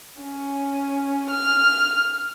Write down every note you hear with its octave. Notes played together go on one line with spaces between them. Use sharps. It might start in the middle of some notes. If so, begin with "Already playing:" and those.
C#4
F6